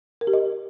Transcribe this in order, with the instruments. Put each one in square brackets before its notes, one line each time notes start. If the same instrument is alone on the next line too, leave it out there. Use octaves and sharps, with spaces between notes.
[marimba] A#4
G4
D#5